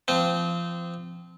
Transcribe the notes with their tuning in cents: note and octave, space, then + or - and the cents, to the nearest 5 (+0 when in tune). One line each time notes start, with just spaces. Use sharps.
F3 -25 C4 -25